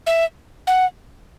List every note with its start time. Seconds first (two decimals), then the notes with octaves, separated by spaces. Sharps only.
0.07 E5
0.67 F#5